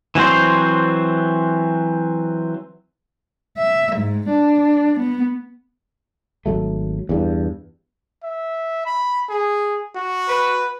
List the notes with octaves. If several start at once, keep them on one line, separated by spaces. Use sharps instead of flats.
E3 F#3 C4 F#4 C5
E5
G#2
D4
B3
G#1 F#3 A3
E2 G2
E5
B5
G#4
F#4
B4